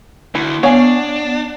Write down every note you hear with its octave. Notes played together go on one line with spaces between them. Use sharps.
D2 E4
B3 D4 C#5 F5 G#5